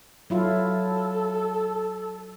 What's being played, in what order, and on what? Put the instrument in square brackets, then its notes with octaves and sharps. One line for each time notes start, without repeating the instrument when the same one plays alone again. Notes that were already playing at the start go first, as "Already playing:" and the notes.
[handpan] F#3 E4 F4 [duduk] A4